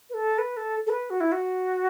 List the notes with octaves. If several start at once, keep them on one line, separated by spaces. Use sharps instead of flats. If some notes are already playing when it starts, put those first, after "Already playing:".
B4
A4
B4
A4
A4
B4
F#4
E4
F#4